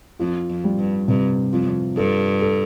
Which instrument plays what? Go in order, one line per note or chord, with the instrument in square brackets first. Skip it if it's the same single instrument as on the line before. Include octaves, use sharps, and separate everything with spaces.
[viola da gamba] F2 [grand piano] F4
[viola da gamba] F2
[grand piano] G3
[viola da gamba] G2
[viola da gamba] G2 [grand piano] C3
[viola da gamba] F2 [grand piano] F4
[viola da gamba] G2 [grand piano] A4
[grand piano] A4